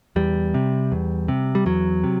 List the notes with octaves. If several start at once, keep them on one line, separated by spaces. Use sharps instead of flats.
E2 G3
C3
E2
C3
G3
E2 F#3
C3